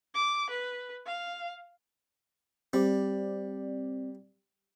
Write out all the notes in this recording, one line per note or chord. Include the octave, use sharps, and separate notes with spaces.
D6
B4
F5
G3 C4 D5